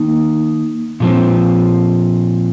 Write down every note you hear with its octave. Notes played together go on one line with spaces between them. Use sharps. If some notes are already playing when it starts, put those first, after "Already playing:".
Already playing: D#3 A#3 D#4
A#2 F3 C4